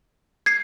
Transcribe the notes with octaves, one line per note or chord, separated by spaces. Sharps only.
G#6 C7